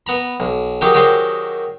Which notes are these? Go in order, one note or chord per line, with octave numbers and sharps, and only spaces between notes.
B3 A#5 B5
B1
D#3 F#3 G4 G#4
D#3 F#3 G4 G#4 C5